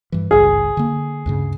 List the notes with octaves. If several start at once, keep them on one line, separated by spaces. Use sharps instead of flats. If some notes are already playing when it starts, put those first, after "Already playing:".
G2 E3
G#1 C#2 G2 G#4
D3 A#3
D2 G2 C#3